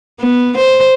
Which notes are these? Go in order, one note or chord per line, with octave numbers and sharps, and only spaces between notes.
B3
C5